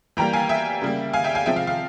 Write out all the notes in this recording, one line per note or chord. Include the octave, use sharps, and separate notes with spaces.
E3 G3 A#3 G5 A#5
F5 G#5
E5 G5
C#3 G3 A#3
F5 G#5
E5 G5
F5 G#5
C3 F3 G#3 E5 G5
F5
F5